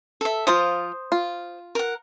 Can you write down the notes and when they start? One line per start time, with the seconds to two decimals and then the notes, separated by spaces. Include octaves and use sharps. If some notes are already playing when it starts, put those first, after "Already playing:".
0.21 A4 E5
0.47 F3 F4 C5 D#6
1.12 F4
1.75 A#4 F#5